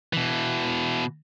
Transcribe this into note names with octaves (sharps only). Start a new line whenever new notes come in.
B2 E3